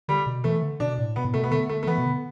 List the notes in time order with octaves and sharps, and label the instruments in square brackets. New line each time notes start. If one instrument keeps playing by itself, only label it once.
[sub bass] D3 [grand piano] G3
[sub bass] B2
[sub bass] E3 [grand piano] A3
[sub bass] D3
[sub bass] B2 [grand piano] D4
[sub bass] A2
[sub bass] B2 [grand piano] B3
[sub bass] A2
[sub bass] B2 [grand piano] A3
[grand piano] B3
[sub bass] D3 [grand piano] A3
[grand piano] A3
A3
[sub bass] E3 [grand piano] B3
[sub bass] B2
D3